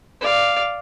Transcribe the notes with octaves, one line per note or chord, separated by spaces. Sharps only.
D5 F5